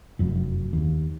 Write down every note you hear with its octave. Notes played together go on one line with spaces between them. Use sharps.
F1 F#2
D#2